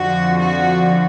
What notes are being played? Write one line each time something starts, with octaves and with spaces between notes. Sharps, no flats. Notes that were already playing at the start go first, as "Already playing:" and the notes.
Already playing: F2 D3 F3 F#4
F#4